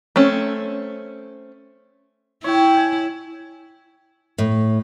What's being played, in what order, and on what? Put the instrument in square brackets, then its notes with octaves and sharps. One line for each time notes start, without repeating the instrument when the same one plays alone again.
[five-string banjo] A3 C4 C#4
[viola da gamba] E4 [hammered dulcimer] C#5 G5
[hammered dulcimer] G#5
[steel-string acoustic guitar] A2